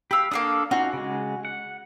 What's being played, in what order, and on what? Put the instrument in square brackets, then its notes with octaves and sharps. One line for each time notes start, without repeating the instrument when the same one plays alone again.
[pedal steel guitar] G4 F5 [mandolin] B5 E6
[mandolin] A#3 A4 D#6 [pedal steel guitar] D4 F5
[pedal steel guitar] C#4 D#4 F4 [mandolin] F#4
[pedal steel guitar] C#3 G#3
F#5